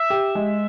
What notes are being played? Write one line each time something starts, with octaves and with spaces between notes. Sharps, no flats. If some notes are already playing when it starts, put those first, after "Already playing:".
Already playing: E5
G4
G#3